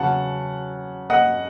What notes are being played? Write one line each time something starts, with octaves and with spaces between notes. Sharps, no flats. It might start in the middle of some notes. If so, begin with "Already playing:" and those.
Already playing: E2 C#3 F#3 F#5 A5
D#5 F#5